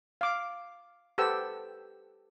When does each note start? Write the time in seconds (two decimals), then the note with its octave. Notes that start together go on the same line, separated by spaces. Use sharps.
0.21 F5 D6
1.18 G4 A4 B4 C5 F#5 E6